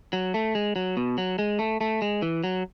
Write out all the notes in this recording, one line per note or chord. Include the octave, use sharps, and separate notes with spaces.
F#3
A3
G#3
F#3
B2
F#3
G#3
A3
A3
G#3
E3
F#3